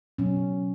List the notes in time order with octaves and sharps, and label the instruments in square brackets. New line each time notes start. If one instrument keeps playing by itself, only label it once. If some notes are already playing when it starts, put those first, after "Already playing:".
[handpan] B2 F#3 C#4